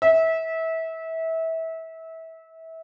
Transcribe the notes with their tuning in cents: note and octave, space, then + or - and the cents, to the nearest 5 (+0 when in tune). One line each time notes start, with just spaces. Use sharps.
E5 -25